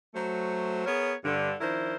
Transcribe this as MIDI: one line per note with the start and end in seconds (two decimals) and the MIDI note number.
0.14 0.82 54
0.14 0.82 57
0.14 0.82 72
0.86 1.14 59
0.86 1.14 68
0.86 1.14 70
0.86 1.14 73
1.24 1.53 43
1.24 1.53 50
1.60 1.95 51
1.60 1.95 53
1.60 1.95 62
1.60 1.95 64
1.60 1.95 70
1.60 1.95 72